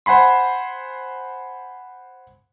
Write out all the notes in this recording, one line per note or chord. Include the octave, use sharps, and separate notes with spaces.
C5 F#5 G#5 B5 C6